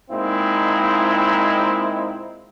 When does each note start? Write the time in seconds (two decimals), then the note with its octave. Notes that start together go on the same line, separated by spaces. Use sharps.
0.11 A#2 G#3 C4 D#4 E4